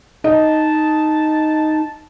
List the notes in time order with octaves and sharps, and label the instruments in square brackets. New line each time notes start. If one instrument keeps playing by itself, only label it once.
[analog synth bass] D#4 [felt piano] D#5 [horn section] A5